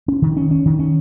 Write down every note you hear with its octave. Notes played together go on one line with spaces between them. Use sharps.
C#4
D#3
C#4
C#4
D#3
C#4